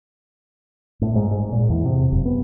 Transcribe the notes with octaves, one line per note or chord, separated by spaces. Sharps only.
A2
G#2
G#2
A#2
E2
C3
F#1
B3